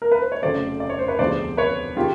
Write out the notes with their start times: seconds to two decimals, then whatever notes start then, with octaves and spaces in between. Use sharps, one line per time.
0.02 A#4
0.12 B4
0.21 C5
0.32 C#5
0.42 F1 F2 C#3 F#3 A3 C5 D5
0.80 D5
0.90 C#5
0.99 C5
1.08 B4 C#5
1.19 E1 D2 C3 F3 G#3 C5 D5
1.57 B4 C#5
1.96 C3 D#3 G#3 F4 G4